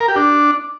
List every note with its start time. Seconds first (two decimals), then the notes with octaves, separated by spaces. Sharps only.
0.01 A#4
0.08 G4
0.16 D4